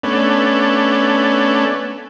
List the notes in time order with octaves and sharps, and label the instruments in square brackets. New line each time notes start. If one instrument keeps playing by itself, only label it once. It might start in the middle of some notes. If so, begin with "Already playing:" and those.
[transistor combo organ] A3 B3 C#4 D4